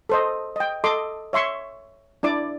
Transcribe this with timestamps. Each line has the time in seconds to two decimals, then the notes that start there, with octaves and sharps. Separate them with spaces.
0.09 A4 C5 D#5
0.56 D#5 G5
0.84 A4 D#5 C6 D6
1.33 C#5 E5 C6 C#6
2.23 D4 E4 D5 D6